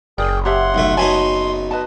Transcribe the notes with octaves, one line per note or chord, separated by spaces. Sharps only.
F#1 G#4 A#4 D5 G5
G4 C#5 E5 F#5 C6
B1 A3
F#3 B3 D#4 C#5 G#5 A5 C6
B4 D#5 A5